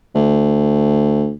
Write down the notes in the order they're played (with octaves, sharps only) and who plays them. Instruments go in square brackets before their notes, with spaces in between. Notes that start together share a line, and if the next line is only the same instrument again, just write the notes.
[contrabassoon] D2